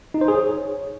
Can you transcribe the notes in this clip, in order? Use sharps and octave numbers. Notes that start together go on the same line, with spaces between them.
D#4
C5
G#4
C#5